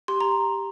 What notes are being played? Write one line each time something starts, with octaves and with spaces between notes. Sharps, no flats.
G4 C6
A#5